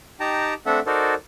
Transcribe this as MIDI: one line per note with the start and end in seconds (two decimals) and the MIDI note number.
0.20 0.54 63
0.20 0.54 67
0.20 0.54 79
0.20 0.54 81
0.20 0.54 82
0.66 0.80 57
0.66 0.80 60
0.66 0.80 62
0.66 0.80 69
0.66 0.80 76
0.66 0.80 78
0.86 1.14 63
0.86 1.14 66
0.86 1.14 69
0.86 1.14 70
0.86 1.14 72
0.86 1.14 74